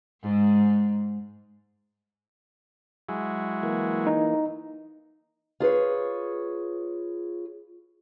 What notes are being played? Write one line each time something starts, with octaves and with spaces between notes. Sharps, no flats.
G#2
F#3 G#3 E4
E3 A#3
D#4
F4 G#4 B4 C#5